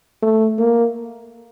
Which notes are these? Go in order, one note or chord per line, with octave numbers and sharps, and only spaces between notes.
A3
A#3